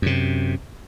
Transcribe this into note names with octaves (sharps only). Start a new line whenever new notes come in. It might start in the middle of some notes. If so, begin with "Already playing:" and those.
F#2 C3